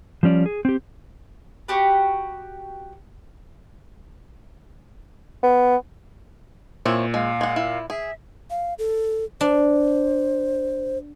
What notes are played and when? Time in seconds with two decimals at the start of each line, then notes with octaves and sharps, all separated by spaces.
0.23 F3 G3 C#4 D5
0.46 G#4
0.65 C4 G4
1.68 F#4 G4 B4
5.43 B3
6.85 A#2 C4 E4 C#5
7.14 G#3 F5
7.41 G#3 F#5
7.56 E4
7.90 G#4 E5
8.50 F5
8.78 A4
9.41 D4 C5